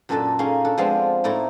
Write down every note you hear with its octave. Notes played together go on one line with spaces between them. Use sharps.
F#2 A#2 D4 A4 D#5 A5
A#3 C#4 D#4 G#4 D#5 F5
D4 A4
F3 G#3 B3 C4 D4 F4
A2 D#4 E4 D5 A#5